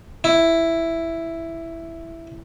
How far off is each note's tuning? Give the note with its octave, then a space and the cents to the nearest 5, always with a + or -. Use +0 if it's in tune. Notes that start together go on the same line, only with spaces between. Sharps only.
E4 +5